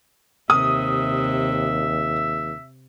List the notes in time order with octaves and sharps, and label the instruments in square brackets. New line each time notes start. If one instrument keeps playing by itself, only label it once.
[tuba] D#2 [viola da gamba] C3 [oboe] E5 [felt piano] D#6